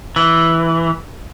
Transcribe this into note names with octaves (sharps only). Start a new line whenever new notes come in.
E3